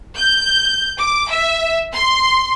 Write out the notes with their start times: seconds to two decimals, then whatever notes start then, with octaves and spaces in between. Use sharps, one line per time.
0.16 G6
0.98 D6
1.30 E5
1.94 C6